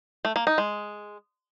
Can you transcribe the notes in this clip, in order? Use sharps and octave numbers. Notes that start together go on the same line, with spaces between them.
A3
A#3
D#4
G#3